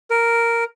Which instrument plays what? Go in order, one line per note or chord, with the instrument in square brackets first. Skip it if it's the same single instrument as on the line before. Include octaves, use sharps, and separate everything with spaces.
[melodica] A#4